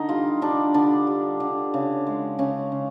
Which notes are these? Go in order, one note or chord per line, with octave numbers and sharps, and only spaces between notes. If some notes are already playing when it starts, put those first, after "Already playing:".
Already playing: D3 D#4
G3 F4
G3 D4
D3 D4
G3
D3
C#3
G#3
C#3 C#4
C#3